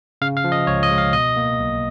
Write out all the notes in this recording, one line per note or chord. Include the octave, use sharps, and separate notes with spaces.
C#3 F5
F5
F3
D#5
C#2 C#5
D#5
G#3
F5
B2 D#5
A#3
B1